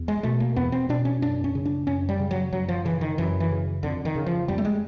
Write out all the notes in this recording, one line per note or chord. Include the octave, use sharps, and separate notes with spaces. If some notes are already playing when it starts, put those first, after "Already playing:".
Already playing: E2
G#3
B2 A3
A#3
E2 B3
C4
B2 D4
C#4
F#2 D4
C#4
C#3
D4
F#2 C#4
G3
C#3
F#3
F#2 F#3
F3
C#3 E3
D#3
F#2 E3
E3
C#3
F2 D3
D#3
C#3
F3
F2 G3
A3
G#3